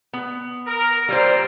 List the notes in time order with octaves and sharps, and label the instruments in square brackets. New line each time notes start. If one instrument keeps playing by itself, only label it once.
[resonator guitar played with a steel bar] B3
[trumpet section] A#4 [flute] A#5
[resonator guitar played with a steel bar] G3 C5 [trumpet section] A#3 C4 F4